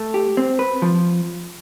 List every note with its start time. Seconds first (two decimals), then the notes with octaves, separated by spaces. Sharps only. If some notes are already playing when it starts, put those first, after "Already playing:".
Already playing: A3
0.14 G4
0.37 C4
0.59 B4
0.82 F3